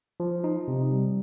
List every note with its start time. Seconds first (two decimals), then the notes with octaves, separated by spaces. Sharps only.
0.20 F3
0.44 D#4
0.68 C3
0.92 G3